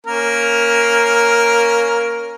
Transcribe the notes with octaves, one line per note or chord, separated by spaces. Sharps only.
A#3 C#4 A#4